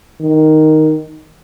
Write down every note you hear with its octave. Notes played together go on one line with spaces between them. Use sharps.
D#3